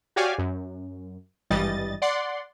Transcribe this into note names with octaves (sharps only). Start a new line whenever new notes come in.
F#4 G4 C#5 D5 F5 G#5
F#2
G#1 G2 E3 G3 D#5 A6
D5 F#5 C6